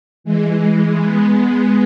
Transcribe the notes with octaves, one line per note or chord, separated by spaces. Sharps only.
E3 G#3
G#3 B3